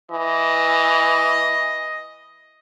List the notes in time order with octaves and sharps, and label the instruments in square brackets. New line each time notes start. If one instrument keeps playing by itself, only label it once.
[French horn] E3 [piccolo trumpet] D#5